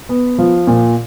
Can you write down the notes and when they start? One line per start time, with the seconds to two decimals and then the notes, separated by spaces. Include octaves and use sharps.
0.09 B3
0.38 F3
0.67 A#2